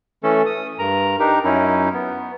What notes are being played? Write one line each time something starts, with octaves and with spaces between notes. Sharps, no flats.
E3 A3 C#4 A4
D#6
G2 A#4 A#5
D4 D#4 G4 A#4
F#2 C#4 D#4 E4
B3